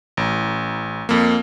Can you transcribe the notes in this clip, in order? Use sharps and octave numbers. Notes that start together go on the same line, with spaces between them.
A1
F2 A#3